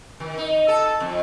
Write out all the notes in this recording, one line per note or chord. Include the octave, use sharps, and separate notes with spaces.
D#3
D#4
A4
F2